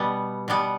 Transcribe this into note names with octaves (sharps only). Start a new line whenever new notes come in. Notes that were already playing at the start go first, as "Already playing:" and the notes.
Already playing: B2 G3 B3
B2 G3 B3